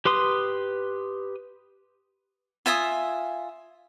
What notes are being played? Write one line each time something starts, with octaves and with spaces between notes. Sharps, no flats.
G4 B4 C6 D#6
F4 E5 G#5 D#6